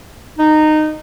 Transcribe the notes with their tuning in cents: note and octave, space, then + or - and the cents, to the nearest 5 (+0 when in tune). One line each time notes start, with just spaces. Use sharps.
D#4 -15